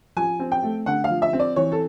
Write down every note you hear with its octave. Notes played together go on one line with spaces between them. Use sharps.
F3 G#5
C4
G5
A3
D3 F#5
F5
F3
E5
C4
D5
E3 C#5
A4